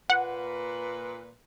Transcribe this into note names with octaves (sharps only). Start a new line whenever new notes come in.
A#2 B4 F#5